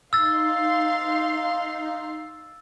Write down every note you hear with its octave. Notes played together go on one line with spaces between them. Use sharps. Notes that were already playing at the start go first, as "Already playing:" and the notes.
D#4 F5 C6 E6 A6